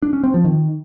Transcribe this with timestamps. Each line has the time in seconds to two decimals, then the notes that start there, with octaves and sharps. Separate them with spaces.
0.02 D4
0.13 C#4
0.24 C4
0.34 F3
0.45 D#3